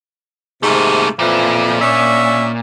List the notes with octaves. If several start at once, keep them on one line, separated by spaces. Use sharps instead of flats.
G#2 C3 A3 A#3
F2 A#2 E3 F3
C#4 D4 E5